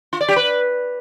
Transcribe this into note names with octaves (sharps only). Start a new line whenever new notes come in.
F4
D5
G4
B4